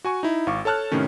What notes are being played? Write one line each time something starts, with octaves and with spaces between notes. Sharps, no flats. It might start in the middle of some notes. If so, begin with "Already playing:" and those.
F#4 G#5 C#6
D#4 E4
G#1 F5 C#6 D6
A4 C#5 A5 F6 F#6
A2 C3 D#3 C#4